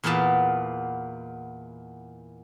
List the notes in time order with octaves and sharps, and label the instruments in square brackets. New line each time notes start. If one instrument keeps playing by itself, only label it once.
[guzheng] E2 A#2 A#3 B3 A5